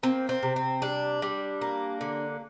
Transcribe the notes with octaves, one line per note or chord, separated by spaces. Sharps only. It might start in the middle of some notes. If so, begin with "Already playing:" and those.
A#3 C4
C4
C3
C4
G3 D4
G3
A#3
D3